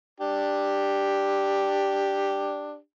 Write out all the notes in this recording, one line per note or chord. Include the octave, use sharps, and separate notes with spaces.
D4 G4